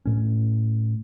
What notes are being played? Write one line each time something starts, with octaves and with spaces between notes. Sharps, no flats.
A2 C#4